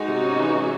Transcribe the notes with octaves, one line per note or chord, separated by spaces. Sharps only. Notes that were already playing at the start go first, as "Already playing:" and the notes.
Already playing: G#3 D#4 F#4
C3
C#4
E3
G#3